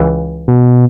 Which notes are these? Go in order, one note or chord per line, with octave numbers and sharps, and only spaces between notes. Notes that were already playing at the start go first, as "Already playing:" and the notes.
Already playing: C#2 C#3 E3
B2